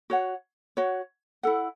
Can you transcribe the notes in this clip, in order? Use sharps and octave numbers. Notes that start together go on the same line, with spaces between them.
F#4 C#5 F#5
F#4 C#5 F#5
E4 A4 F#5